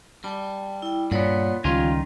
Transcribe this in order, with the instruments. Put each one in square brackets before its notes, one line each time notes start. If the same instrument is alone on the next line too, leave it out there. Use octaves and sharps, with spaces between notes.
[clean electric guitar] G3 [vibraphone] G5 A5
[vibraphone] E4 G5
[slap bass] G2 [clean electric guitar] A#2 B3 [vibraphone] C#5 D5 F#5
[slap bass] C#2 G3 [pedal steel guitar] D#3 [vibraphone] C#4 [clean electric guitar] F4 G#5